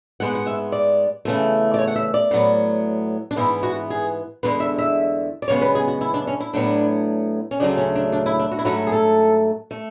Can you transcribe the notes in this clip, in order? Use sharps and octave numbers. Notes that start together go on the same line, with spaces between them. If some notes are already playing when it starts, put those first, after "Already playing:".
G#2 G#3 B3 F#5
F#5
E5
D5
E2 C#3 E3 A3
D5
C#5
F#5
E5
D5
A2 F#3 B3
D4
G#2 E3 B3 E4
F#4
G#4
E2 D3 G#3 B4
E5
E5
D5
F#2 C#3 G#3 B3 C#5
B4
G#4
F#4
E4
D4
C#4
E4
A2 F#3 B3 D4
C#4
D2 C#3 F#3 A3 D4
C#4
D4
D4
E4
D4
F#4
E4
G#2 F#3 A3 F#4
G#4
A4
A3